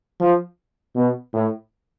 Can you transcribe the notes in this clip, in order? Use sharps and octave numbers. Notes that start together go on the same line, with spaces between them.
F3
B2
A2